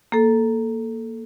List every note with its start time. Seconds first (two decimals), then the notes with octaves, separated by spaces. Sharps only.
0.12 A#3 A4